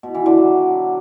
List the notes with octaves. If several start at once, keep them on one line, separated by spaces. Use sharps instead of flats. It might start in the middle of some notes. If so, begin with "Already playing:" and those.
B2
E3
D3
F#3